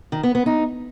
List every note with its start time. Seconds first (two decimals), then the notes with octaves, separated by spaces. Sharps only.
0.12 D#3
0.23 B3
0.35 B3
0.46 D#4